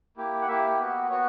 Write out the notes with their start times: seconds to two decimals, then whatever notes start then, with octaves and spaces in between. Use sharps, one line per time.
0.17 A#3 E4 G4
0.42 F#5
0.48 A#3 E4 G4 E5
0.79 B3 F#4
1.10 B3 F#4 C#5